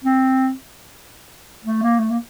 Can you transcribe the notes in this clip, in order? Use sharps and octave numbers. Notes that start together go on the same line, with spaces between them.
C4
A3
A#3
A3
A#3